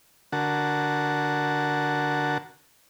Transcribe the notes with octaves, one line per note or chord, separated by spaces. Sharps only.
D3 F#4 A#4 F#5 A5